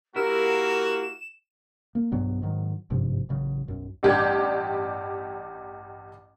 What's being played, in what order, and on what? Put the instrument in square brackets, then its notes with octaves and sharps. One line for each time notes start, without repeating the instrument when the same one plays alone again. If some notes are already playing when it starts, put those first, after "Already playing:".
[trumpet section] A#3 F#4 [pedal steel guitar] E4 G4 E6 [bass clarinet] A#4 [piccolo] E7
[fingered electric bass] A#3
B1 G2 F#3 B3
G#2 D#3 F#3
G#1 G2 C3 F3
A1 C#3 F#3
B1 F#2
[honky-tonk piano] A1 G2 G4 D5 G6 G#6